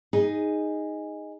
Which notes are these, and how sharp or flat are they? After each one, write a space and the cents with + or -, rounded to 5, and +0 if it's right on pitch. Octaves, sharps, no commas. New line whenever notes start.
D#4 +0 G#4 -10